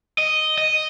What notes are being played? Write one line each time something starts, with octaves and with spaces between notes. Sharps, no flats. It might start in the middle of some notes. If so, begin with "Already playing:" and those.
D#5
D#5